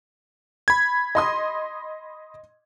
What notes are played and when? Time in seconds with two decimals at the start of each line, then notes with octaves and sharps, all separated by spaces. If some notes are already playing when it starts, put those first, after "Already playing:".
0.68 B5 G#6
1.15 D#5 C6 D#6